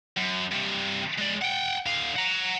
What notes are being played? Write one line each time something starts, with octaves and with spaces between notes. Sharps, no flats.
F#2
G2 C3
G#3 D5
F#5 G5
D3 F5
F#5 A#5